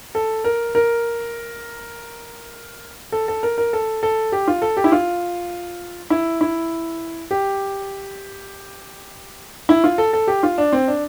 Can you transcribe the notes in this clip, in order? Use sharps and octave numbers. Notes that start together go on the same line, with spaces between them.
A4
A#4
A#4
A4
A4
A#4
A#4
A4
A4
G4
F4
A4
G4
E4
F4
E4
E4
G4
E4
F4
A4
A4
G4
F4
D4
C4
D4